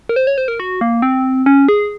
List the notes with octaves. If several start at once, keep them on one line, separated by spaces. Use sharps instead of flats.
A#4
C5
C#5
C5
A#4
F#4
A#3
C4
C#4
G#4